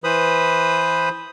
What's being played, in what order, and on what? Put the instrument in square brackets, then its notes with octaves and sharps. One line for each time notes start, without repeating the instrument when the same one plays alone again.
[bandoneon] E3 B4 C5 B5 D#6